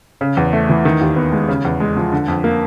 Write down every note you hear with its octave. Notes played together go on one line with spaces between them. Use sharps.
C#3
E2
A3
E3
D#3
D#2
B3
G#3
C#3
E2
G#3
F3
D3
F2
A#3